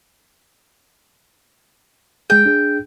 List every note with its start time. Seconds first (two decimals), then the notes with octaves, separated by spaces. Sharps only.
2.30 G#3 G#4 G5
2.46 D4 G#4